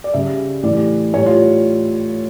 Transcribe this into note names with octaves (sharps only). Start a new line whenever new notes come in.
D5
C#3 G3 E5
A2 E3 G3 D5
A2 C#5
G3
F4